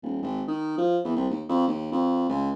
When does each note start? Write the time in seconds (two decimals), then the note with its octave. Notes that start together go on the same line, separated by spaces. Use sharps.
0.02 D#1
0.22 G#1
0.47 D#3
0.78 F3
1.04 E2
1.16 C2
1.30 D#2
1.49 F2
1.68 D#2
1.92 F2
2.29 C#2